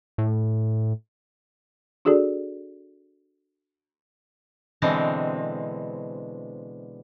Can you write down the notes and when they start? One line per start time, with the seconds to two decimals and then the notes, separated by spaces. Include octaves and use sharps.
0.18 A2
2.05 D4 F#4 G#4 A4 D5
4.82 B2 D3 E3 G#3 C4